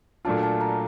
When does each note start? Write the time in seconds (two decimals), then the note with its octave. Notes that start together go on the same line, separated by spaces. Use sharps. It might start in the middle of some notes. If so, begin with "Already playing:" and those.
0.25 A#2 F#3 A3 D4 F4 A5
0.43 A5
0.61 A#5